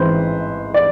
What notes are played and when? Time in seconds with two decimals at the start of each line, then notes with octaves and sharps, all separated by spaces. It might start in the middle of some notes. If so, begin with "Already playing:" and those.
Already playing: A1 G#2 E3 G#3 C4 B4 C5
0.74 D5